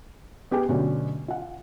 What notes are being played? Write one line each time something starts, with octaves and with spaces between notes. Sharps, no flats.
B3 G4 G#4 G5 G#5
B2 D3 F#3 A3 C#4
F4 F#5